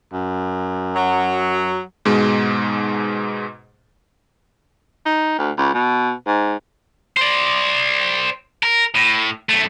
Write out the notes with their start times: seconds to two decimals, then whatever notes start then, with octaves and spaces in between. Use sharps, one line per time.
0.13 F#2
0.94 F#3
2.05 G#2 B2 G#3
5.06 D#4
5.39 D2
5.58 C#2
5.74 B2
6.27 G#2
7.17 C5 D5
8.63 A#4
8.95 A2
9.49 F#2 A3